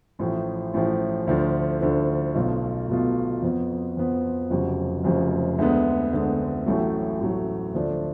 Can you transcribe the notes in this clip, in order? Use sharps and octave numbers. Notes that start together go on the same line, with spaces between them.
A1 A2 F3
A1 A2 F3
D2 D3 F3
D2 D3 F3
B1 B2 A3 F4
B1 B2 A3 F4
F2 F3 B3
F2 F3 B3
F1 F2 C#3 F#3
F1 F2 C#3 F#3
D2 D3 G#3 B3
D2 D3 G#3 B3
A1 A2 F#3 A3
A1 A2 F#3 A3
D2 D3 F3 A3 D4